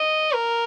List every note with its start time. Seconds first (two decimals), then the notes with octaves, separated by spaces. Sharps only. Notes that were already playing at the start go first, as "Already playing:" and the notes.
Already playing: D#5
0.34 A#4